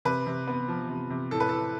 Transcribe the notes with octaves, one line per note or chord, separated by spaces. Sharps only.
C3 B4
C3
B3
F3
C3
C3
A2 A4
B4
A2 A4